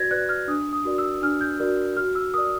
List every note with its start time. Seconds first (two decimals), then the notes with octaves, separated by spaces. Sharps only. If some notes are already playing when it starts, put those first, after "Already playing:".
Already playing: F#4 B4 D5 G#6 A#6
0.11 B4 D5 F#6
0.29 F6
0.48 D4 D#6
0.73 D#6
0.85 F#4 A#4 D5
0.98 E6
1.22 D4 F6
1.41 G6
1.60 F#4 A#4 D5
1.97 F#4 F6
2.15 E6
2.34 A#4 D5 D#6